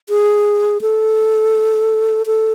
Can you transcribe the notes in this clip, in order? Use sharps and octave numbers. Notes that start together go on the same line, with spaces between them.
G#4
A4
A4